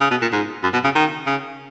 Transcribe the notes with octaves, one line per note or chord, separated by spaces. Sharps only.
C#3
B2
A#2
G#2
F#2
B2
C#3
D#3
C#3